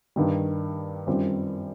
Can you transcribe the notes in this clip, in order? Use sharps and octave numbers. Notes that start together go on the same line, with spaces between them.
G2 D#3 G3
F#2 D#3 G3 C4 F4